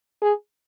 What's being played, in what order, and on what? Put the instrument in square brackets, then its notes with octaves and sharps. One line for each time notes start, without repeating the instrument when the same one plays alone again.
[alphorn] G#4